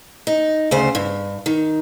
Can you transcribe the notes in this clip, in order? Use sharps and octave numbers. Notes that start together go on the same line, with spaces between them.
D#4
D2 C#3 C5
G2
D#3